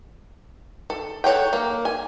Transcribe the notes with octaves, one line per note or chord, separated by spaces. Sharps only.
A4
A4 C#5 F#5 G5
A#3
G#5